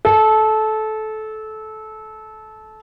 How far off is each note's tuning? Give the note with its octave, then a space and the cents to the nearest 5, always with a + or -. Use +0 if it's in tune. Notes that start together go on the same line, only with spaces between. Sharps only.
A4 -20